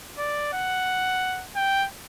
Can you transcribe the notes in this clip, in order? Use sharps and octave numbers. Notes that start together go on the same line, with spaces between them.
D5
F#5
G5